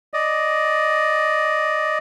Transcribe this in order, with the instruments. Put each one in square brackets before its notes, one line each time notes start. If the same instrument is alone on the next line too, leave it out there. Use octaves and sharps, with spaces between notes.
[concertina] D5 D#5